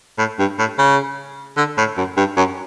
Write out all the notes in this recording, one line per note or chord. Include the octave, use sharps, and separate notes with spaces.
A2
G2
A2
C#3
D3
A2
F#2
G2
F#2